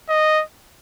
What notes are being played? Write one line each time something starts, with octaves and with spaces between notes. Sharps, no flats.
D#5